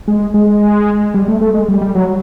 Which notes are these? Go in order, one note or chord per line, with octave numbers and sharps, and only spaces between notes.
G#3
G#3
G3
A3
A3
G#3
G3
G3
F#3